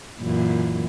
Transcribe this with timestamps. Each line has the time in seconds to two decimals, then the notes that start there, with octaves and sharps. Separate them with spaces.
0.21 F#2 A#2 E3